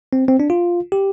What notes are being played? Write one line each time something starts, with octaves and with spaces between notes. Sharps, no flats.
C4
C4
D4
F4
G4